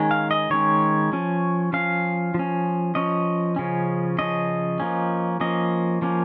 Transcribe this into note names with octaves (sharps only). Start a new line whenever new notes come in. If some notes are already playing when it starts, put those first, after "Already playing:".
Already playing: D#3 G#3 C#4
F5
D#5
D#3 G#3 C#4 C#5
F3 C#4
F3 C#4 F5
F3 C#4
F3 C#4 D#5
C#3 F3 C#4
C#3 F3 C#4 D#5
F3 A#3 C#4
F3 A#3 C#4 D#5
F3 A#3 C#4